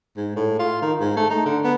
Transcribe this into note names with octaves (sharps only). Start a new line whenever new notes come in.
G#2
A2
F4
D#3
G#2
A3
D#4
D3
B3